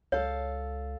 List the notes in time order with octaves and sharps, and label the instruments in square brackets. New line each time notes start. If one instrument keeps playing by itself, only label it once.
[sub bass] C#2 [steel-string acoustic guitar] A4 F5 [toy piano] C#5